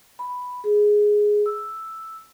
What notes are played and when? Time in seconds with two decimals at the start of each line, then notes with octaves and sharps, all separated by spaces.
0.19 B5
0.64 G#4
1.46 E6